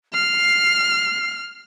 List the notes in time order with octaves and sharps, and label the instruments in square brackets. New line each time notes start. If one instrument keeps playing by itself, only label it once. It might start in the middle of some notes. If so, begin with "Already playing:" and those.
[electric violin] F6 [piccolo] C7